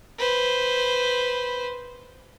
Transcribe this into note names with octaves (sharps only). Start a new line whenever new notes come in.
B4 C5